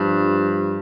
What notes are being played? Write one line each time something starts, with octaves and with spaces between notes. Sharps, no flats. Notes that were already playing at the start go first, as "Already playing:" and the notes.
Already playing: G2 F3